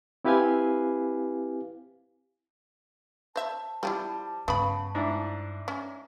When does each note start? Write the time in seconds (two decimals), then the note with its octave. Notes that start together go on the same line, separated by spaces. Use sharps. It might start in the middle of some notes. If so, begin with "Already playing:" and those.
0.25 C4 E4 G4 B4 F5 G#5
3.36 C5 E5 A5
3.83 F3 G3 C#4 E4
4.48 G2 C#3 A3 B3 B5
4.95 G#2 D4 E4
5.68 C#4